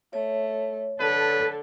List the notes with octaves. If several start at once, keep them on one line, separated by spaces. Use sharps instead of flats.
A3 C#5
D3 A4 B4